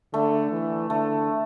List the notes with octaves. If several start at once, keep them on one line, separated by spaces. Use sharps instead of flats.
D3 A3
E3
D3 A3